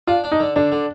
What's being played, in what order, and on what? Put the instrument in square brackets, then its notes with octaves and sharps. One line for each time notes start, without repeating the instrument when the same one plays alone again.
[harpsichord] D4 [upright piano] F4
[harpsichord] D4
[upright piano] D#4
[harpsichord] D3
[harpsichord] D3 [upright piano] D4
[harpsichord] D3